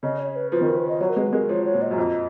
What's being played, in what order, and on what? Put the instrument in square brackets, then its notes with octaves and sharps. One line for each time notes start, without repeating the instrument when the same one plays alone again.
[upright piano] C#3 [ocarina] D#5
[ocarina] C#5
B4
[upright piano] F3 [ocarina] B4
[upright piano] D#3 [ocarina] A#4
[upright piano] F3
[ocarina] B4
D#5
[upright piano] F#3 [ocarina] C#5
[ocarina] A#4
[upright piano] G#3 [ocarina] B4
[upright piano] G#3 [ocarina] A#4
[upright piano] F3 [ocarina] C#5
[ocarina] C#5
[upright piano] A#2
[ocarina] D#5
[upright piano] F#2
F2